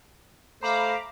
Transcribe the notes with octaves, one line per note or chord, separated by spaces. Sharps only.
A3 C5 F5 A#5 B5 D6